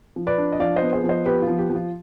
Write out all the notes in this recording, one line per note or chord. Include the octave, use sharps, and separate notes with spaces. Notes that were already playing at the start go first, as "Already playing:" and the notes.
F3
B4 D5
D4
D#5
F3 D5 F5
C5 D#5
B3
G#4 C5
F3
C5 D#5
B3 G4 B4
F4
F3
G4
F3
F4